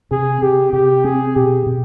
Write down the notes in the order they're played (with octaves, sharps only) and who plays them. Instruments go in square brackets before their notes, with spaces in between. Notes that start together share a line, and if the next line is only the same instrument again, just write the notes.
[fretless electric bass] C3 [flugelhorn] G#4
[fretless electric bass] C3 [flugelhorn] G4
[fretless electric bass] C3 [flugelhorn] G4
[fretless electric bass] C4 [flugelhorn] G#4
[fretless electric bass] B2 [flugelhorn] G4
[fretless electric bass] B2